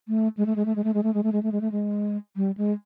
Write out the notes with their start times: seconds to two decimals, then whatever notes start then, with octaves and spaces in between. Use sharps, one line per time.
0.08 A3
0.37 G#3
0.46 A3
0.56 G#3
0.65 A3
0.76 G#3
0.84 A3
0.94 G#3
1.03 A3
1.14 G#3
1.23 A3
1.32 G#3
1.43 A3
1.52 G#3
1.61 A3
1.72 G#3
2.36 G3
2.57 G#3